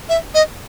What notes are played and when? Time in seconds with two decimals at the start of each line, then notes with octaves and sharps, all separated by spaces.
0.09 E5
0.34 D#5